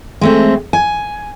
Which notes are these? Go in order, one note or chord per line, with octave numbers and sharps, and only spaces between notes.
G#3 A3 C4
G#5